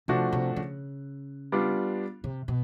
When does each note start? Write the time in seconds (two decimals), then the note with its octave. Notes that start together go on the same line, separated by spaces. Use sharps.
0.08 C3 F3 A3 D4 F#4
0.32 C3
0.56 C#3
1.52 G3 B3 D4 F4
2.24 C3
2.48 B2